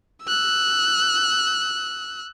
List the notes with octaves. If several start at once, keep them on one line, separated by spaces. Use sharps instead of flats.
E6 F#6